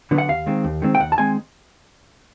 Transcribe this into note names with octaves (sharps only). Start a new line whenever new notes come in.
D3 F#3 B3
F#5
D#2 F5
D#3 G#3 C4
D#2
D#3 G#3 C4
G5
D#2 F#5
A5
D#3 G#3 C4 G#5